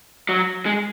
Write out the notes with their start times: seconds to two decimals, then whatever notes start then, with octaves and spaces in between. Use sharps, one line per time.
0.29 F#3
0.66 G#3